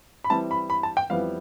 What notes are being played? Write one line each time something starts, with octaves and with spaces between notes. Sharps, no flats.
B5
E3 G3 C4 E4 A5
B5
B5
A5
G5
F2 E3 G3 B3 E4 F5